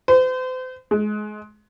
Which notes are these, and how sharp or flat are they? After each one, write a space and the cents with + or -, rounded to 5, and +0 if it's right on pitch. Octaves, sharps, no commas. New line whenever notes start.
C5 -40
G#3 +25